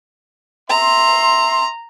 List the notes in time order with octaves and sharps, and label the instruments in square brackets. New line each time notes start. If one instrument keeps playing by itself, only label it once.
[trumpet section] E5 C6 [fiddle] A#5